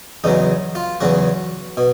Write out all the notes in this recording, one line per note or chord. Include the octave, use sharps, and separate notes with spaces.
E2 C#3 F#3 D#4
F4
E2 C#3 F#3 F#4
B2